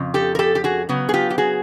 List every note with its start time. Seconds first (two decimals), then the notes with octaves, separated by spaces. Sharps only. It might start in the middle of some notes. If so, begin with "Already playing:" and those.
Already playing: F2 C#3
0.14 G4 A4
0.35 A#4
0.39 G4 A4
0.55 G4
0.64 F#4 G#4
0.89 C#3 F#3 B3
1.09 G#4
1.14 F4 G4
1.30 G4
1.38 F#4 G#4